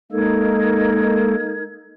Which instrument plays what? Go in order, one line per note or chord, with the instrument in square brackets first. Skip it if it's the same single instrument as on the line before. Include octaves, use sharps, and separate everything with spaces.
[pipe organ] G#3 A#3 A4 [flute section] D#4 A#4 G#6